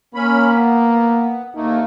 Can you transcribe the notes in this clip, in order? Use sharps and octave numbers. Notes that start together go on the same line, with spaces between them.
A#3 C#4 B5
B3
D#2 A3 A#3 D#4